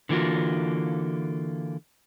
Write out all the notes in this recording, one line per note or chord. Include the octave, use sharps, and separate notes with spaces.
D3 E3 A#3 F4 F#4